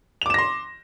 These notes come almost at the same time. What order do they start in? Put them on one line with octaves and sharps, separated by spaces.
F7 D6 E7 A#6 C6